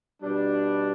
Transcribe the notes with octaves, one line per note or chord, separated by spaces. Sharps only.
B2 G3 D4